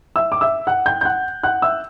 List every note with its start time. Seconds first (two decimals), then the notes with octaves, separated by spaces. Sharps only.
0.16 E5 E6
0.32 D6
0.41 E5 E6
0.67 F#5 F#6
0.86 G5 G6
1.01 G6
1.05 F#5 F#6
1.43 F#5 F#6
1.62 E5 E6